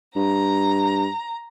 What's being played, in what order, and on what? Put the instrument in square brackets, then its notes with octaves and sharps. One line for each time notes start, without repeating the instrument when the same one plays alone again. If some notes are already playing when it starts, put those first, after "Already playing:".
[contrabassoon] G2 [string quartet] A#5